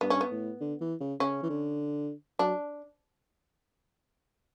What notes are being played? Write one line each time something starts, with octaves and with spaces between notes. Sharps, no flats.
G2 B3
C#4
B3
A2
D3
E3
C#3
C#3 C#4
E3
D3
F#3 D4